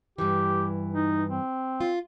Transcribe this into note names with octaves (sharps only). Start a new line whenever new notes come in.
G2 E3 G4
D#4
C4
F4